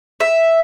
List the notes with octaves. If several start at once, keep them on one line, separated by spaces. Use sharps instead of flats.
E5